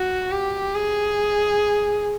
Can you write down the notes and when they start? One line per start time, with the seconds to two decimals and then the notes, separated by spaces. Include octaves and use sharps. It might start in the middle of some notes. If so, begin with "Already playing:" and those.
Already playing: F#4
0.31 G4
0.75 G#4